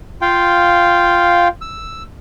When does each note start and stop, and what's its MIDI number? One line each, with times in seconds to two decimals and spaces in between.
0.22 1.48 65
0.22 1.48 77
0.22 1.48 79
1.62 2.03 88